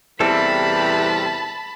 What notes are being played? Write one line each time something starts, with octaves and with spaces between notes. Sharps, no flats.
E2 C3 E3 G3 C4 A4 A5 B5